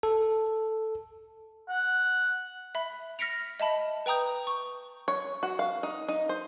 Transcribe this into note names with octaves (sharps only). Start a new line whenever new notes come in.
A4
F#5
E5 B5
F6 A#6 B6 C#7 D7 F7
D#5 E5 A5 B5
B4 G5 A#5 D#6 G6
C#6
C#5
F#4
F5
D#4
D#4
C5